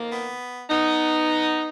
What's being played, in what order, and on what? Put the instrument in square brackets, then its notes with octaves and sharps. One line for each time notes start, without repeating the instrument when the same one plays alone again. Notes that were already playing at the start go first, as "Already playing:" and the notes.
Already playing: [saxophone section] F2 D#3 A#3
B3
B3 D#4